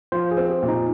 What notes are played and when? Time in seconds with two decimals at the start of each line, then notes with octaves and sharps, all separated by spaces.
0.12 F3 C5
0.31 G#4
0.37 C4
0.50 G4
0.62 A#2
0.68 D#4